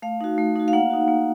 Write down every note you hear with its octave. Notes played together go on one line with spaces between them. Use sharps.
A3 F5
D#4 F#4
A3
D#4 F#4
F5
A#3 F#5
D#4 F#4
A#3